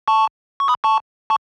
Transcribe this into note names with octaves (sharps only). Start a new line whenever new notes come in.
A5 C#6
C#6
B5 D#6
A5 C#6
A5 C#6